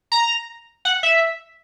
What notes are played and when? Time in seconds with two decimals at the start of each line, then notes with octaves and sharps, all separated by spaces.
0.12 A#5
0.85 F#5
1.03 E5